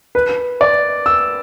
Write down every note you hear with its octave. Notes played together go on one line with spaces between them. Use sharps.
B4
D5
E6